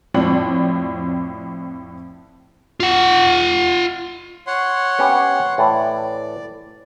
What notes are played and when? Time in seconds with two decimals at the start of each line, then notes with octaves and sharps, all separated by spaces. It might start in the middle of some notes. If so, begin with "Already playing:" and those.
0.14 F2 A2 C4 C#5 D5 F#7
2.80 F4 F#5
4.47 C#5 F#5 C6
4.99 B3 C#4 G4
5.58 A2 E3 D5